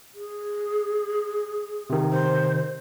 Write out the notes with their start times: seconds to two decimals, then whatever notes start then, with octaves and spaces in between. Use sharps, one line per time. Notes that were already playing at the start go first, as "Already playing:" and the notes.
0.14 G#4
1.90 C3 D#3
2.11 C5